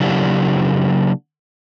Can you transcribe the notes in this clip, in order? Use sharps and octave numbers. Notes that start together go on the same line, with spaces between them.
C#3 F#3 A#3 D4 E4 G4